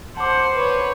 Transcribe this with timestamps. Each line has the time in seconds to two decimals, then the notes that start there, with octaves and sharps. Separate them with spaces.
0.17 C5 F#5 A5 D6
0.54 B4 C#5